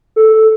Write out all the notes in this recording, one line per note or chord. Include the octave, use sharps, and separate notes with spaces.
A4